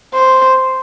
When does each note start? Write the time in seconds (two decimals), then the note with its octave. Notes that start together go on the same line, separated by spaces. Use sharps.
0.14 C5